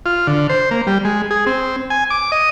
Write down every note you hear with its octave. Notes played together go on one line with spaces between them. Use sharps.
F4
D3
C5
A#3
G3
G#3
G#4
C4
G#5
D6
D#5